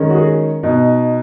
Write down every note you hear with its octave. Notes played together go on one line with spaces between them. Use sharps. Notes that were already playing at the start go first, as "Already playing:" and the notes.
Already playing: D#3 G#3 C#4
F#4
G#4
B2 B3 D#4